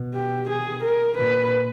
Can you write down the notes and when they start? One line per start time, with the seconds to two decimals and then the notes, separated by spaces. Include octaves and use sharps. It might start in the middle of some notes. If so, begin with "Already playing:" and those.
Already playing: B2
0.14 G4
0.49 G#4
0.83 A#4
1.17 A#2 B4